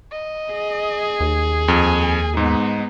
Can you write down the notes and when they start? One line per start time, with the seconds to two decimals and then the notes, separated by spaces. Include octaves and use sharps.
0.12 D#5
0.53 G#4
1.20 D#2
1.68 F2 G#5
2.37 G#2 G#3 B3 D#4